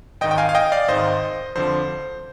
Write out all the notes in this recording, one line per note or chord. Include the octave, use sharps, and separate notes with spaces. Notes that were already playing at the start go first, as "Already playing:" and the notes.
G#1 G#2 D#3 D#5 G5
G5
F5 G#5
F5
D#5 G5
D5 F5
G#1 G#2 D#3 C5 D#5
F2 D3 F3 C5